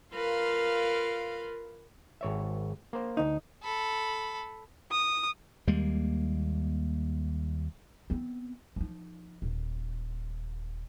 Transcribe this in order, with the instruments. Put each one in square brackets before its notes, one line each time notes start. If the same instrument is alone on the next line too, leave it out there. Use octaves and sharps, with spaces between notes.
[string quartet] F4 A#4 B4 F5 C6
[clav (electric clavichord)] G#1 C#5 E5
A#3 C5
[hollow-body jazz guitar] D2 D#4
[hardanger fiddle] A4 B5
[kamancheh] D#6
[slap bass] D#2 G3 G#3 A#3
[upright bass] B3 C4
F3 D#4
D#1